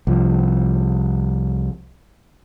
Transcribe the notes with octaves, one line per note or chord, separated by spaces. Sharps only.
C2 F3